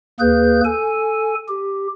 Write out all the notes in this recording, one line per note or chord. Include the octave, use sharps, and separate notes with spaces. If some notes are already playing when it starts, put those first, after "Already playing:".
D#2 A#3 G#4 B4 G6
A4 G#5
G4